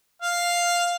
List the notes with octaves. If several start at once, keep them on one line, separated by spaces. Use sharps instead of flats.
F5